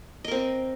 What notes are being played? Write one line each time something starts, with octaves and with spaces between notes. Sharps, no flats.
C4 A#4 D#5